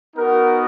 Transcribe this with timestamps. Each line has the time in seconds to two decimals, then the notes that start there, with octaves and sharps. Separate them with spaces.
0.15 B3 D#4 F#4 A#4